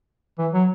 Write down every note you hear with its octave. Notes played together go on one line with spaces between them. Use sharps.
E3
F#3